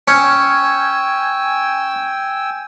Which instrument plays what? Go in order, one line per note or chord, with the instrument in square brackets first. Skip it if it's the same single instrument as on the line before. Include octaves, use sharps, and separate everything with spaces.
[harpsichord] C#4 [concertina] G5 G#5 E6